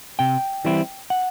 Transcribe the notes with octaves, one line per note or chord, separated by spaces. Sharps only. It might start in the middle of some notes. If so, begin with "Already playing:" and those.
C3 G5
E3 G3 C4 E4
F#5